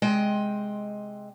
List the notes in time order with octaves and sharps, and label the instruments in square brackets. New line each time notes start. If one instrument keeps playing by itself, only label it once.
[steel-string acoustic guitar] C3 G#3 D#5 G5